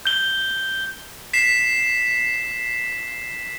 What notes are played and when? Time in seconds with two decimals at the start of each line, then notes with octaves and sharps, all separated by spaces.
0.05 G6 G7
1.33 B6 C7 E7